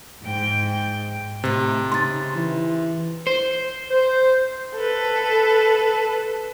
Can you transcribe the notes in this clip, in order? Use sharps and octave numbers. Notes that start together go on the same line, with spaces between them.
G#2 G5
A2 C3 D#3
C#3 D#4 C6 A6
E3
C5
C5
A4 B4